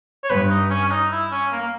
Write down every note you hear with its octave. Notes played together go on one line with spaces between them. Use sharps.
C#5
G2 B4
D#4
C#4
C#4
D#4
E4
C#4
A#3
A#3